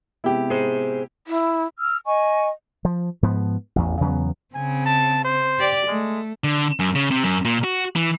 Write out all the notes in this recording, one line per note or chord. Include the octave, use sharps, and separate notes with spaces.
C3 G#3 B3 E4 G4
G#4 C5
E4
E6 F6
D#5 G#5 C#6
F3
G#2 F3 B3
A1 E2
E2 C#3 F#3 B3
C#3 C4 G#5
A5
C5
G4 D5
G#3 A3
D3
F#2
C#3
C3
F#2
A#2
F#4
E3